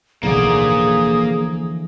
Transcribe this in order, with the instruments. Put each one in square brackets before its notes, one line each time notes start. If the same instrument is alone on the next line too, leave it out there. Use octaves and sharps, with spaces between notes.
[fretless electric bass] D1 B1 [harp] D3 E3 F3 [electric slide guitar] A#3 D5 [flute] G#4